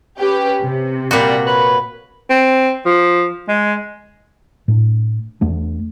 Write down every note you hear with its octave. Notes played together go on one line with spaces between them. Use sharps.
C#4 G4 B4
C3
A#2 G3 F#4
B4 C#5
C4
F3
G#3
A2 A3 D4
E2 A3 D4